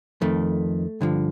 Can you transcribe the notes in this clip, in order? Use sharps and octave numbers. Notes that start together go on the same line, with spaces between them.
F2 D#3 A3
G2 D3 F3